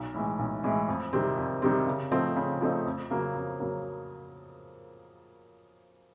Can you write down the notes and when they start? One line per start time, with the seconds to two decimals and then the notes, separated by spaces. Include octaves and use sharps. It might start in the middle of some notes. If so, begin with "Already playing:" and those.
Already playing: B1
0.14 A2 E3 G#3
0.39 B1
0.63 A2 E3 G#3
0.88 F2
1.13 C3 D#3 G3 C4
1.37 F2
1.62 C3 D#3 G3 C4
1.87 C#3
2.11 F3 A3 C4 D#4
2.36 C#3
2.61 F3 A3 C4 D#4
2.86 F2
3.11 C#3 F#3 A#3
3.35 F2
3.60 C#3 F#3 A#3